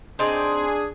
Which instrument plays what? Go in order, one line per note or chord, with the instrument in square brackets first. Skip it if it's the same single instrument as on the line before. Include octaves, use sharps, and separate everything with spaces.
[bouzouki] C4 D#4 D5 [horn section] D4 G#4